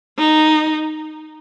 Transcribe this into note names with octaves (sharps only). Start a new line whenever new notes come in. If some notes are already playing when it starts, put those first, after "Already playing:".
D#4